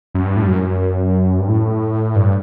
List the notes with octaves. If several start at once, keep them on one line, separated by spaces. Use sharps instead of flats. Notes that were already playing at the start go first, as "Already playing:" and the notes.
F#2
G2
A2
G2
F#2
G2
A2
G2